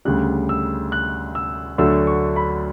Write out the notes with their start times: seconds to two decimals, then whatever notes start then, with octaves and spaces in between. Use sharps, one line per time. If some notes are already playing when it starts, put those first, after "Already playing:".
0.05 D2 C#3 G3 F#6
0.49 E6
0.92 F#6
1.35 E6
1.78 D2 D3 F#3 A3 E6
2.07 C#6
2.36 B5